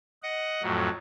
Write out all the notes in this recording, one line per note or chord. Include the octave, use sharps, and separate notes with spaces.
D#5 F#5
F2 A2 F#3